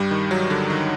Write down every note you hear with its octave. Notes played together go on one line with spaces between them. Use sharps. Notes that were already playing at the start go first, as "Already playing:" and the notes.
Already playing: G2 G3
D#3
F#3
D3 D4
D#3 D#4